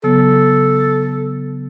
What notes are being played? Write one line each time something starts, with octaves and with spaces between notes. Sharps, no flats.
C#3 F#3 B3 A4